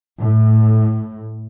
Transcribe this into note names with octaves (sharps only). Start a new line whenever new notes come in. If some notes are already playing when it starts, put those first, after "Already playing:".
A2